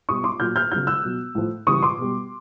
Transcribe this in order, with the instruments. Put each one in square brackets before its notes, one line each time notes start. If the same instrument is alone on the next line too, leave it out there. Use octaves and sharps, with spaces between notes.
[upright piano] B2 G3 C#6 D#6
C6 D6
A#2 F#3 F6 G6
F6 G6
C#3 F#3 F6 G6
E6 F#6
B2 F#3
A2 F3
C#3 E3 G3 C#6 D#6
C6 D6
B2 G3